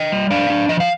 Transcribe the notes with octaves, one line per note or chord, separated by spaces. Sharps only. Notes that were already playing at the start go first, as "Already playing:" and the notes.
Already playing: D#5 G5
G3
D4 D5 F5
D4
F3 D#5
F5